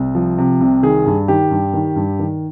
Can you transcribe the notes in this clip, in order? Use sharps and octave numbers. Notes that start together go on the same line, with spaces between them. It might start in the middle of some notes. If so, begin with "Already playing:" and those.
Already playing: C2
F3
C3
C2
D#3 G#4
G2
D#3 G4
G2
D#3
G2
D#3